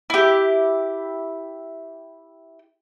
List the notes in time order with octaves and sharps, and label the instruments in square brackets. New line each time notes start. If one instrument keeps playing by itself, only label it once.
[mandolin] E4 G4